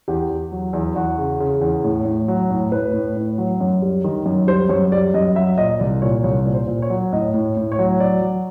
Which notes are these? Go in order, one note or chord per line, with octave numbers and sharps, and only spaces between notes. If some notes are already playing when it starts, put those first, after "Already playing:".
E2 G4
E2
F#3
E2
E2 F#4
C#3
C#3
E2
A2
A2
F#3
A2
A2 B4
A2
A2
F#3
F#2
G3
D#3
F#2
G3 C5
F#2 C#5
G3 D5
F#2 D#5
F#3 E5
A#2 D#5
C2 D5
A#2 C#5
C2 C#5
A#2
C5
A#2
C#5
F#3
A2 D#5
A2
A2
C#5
F#3
F#3 D5
F#3